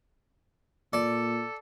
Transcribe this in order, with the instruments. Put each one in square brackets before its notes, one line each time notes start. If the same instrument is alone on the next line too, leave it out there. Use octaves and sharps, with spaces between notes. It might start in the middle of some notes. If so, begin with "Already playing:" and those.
[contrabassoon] A#2 [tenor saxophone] A4 [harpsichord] D5